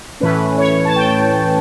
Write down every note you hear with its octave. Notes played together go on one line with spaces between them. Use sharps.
A2 E3 A3 C#4 B4
C#5
A5
G5